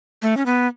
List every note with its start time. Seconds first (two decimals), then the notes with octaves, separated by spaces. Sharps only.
0.22 A3
0.37 C#4
0.46 B3